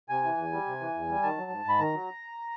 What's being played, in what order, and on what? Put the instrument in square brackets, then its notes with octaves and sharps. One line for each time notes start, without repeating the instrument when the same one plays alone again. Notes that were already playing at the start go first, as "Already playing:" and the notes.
[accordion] C3 G#5
E3
E2
G3
C3
E3
E2
G3
D#3 A5
F#3
G#2
G#2 B5
D#3 A#5
F#3